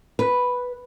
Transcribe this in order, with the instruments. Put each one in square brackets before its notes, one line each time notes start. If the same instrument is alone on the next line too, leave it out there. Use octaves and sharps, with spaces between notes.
[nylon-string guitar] B4